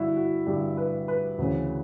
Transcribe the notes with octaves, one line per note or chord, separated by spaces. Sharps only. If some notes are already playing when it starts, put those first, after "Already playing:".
Already playing: G2 D3 E4 F#4
F#4
G2 D3 G4
B4
B4
D2 C#3 E3